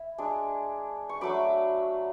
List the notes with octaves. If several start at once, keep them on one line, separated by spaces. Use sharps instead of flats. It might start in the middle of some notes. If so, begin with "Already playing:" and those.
Already playing: E4 B5
G#3 D4
C#6
F#3 A3 D4 B5 D6